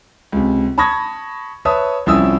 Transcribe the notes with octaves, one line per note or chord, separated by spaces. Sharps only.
C#2 C3
A5 B5 C#6 D#6 G#6 A#6
B4 C#5 E5 A5 D#6
C2 F3 C#4 E4 D#6 E6